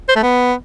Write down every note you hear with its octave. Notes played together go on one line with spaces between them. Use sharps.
C5
A3
B3